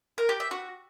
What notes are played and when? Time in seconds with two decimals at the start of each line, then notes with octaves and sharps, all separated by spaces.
0.18 A#4
0.29 G4
0.40 E5
0.51 F#4